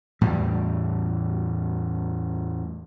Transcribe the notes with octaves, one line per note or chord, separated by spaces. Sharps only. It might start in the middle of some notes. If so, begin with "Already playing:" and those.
E2 A2 G3